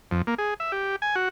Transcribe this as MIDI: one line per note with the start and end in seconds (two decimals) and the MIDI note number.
0.11 0.22 41
0.27 0.35 58
0.38 0.54 68
0.60 0.72 76
0.72 0.96 67
1.02 1.15 80
1.16 1.29 66